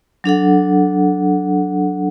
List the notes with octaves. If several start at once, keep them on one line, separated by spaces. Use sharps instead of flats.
F#3 D4 A4 F#5